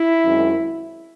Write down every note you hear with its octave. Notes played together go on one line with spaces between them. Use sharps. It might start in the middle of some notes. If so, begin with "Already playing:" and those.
Already playing: E4
F#2 D#3 G#3 C4